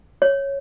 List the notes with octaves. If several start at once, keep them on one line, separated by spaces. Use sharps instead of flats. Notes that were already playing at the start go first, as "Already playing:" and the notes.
C#5